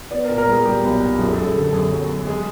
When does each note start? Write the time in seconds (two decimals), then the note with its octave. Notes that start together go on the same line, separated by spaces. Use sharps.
0.11 B3 D5
0.25 A#4
0.29 A#2
0.38 A#4
0.47 G3 G#4
0.65 G3 G4
0.83 B1
1.01 A#2
1.19 F#2 G#4
1.32 A4
1.37 F#2
1.46 G#4
1.55 D3 A4
1.73 F#2 G#4
1.91 F#3
2.09 F#3
2.27 G#3 G#4